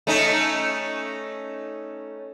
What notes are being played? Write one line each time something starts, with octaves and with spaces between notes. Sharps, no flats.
A3 C#4 D#4